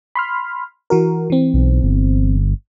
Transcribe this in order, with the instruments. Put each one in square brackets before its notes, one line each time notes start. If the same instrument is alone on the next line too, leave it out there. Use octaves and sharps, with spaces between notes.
[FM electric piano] B5 C6 F6
E3 F#4 A#4
E3 C4
[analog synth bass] B1
G1